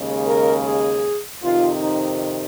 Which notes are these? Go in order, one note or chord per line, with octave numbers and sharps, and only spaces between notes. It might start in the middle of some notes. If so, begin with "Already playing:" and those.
Already playing: D#2 C#3 G#3
A#4
G#4
F2 C3 D#3 F4
D#4